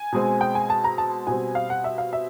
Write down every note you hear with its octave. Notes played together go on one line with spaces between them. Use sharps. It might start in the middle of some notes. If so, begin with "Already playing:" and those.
Already playing: G#5
B2 G#3 C4
G5
G#5
A5
A#5
A5
B2 G3 C4 G#5
F5
F#5
E5
F5
E5